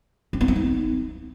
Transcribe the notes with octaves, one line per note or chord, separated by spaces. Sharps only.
C#4
B3
C4
D#4